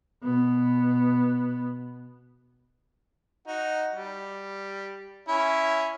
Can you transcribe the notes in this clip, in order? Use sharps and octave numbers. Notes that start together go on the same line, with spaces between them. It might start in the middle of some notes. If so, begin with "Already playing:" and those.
B2 B3
D#4 F#4
G3
C#4 E4